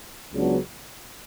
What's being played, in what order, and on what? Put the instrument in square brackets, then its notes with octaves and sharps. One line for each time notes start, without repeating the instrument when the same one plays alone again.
[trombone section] C#2 C#3 F#3 B3 D4